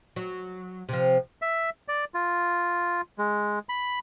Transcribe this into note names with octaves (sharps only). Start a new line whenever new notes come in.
F#3
C3 F3
E5
D5
F4
G#3
B5